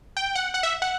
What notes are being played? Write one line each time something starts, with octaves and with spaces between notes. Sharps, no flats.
G5
F#5
F#5
E5
F#5